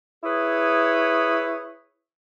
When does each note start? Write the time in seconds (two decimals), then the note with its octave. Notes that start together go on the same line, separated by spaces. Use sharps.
0.24 E4 G#4 B4 C#5 D#6